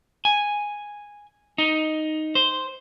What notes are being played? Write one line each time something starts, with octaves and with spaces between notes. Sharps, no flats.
G#5
D#4
C5